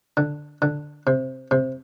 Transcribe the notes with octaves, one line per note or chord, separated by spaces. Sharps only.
D3
D3
C3
C3